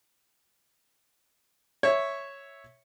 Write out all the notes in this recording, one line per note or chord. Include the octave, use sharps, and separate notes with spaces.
C#5 E5